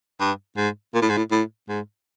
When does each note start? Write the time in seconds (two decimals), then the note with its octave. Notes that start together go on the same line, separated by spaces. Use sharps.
0.20 G2
0.57 G#2
0.94 A#2
1.02 A2
1.10 G#2
1.17 A2
1.31 A2
1.69 G#2